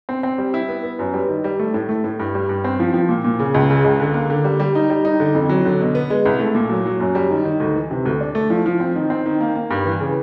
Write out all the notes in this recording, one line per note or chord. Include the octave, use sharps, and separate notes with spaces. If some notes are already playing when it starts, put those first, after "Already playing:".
C4
C4
G3
E4
B3
B3
F#2
G3
D#3
G3
A3
A2
A3
A2
G2
G3
G2
C4
F3
F3
A#2
A#2
C#3
C#2
C#3
C#2
D3
A#3
D3
G3
G3
D#4
G3
D#4
D3
F2
F#3
D3
B2
B3
G#3
C2
A3
A#2
F#3
F#3
F#2
G3
D#3
D#3
D2
E3
C3
D2
D4
A3
F3
F3
C4
D#3
C4
D#3
A#3
A#3
G2
E3
C#3